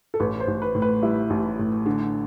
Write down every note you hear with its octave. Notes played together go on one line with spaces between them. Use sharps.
A4
A1 B4
C5
A1
B4
A2
B4
G3 E4
A1
A2
D3